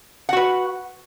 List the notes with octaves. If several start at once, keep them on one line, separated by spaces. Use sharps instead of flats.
F#4 B4 F#5